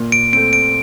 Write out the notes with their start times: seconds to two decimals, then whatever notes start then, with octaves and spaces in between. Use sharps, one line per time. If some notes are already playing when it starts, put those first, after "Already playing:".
Already playing: A#2
0.12 D7
0.33 C4 D7
0.36 A3
0.53 D7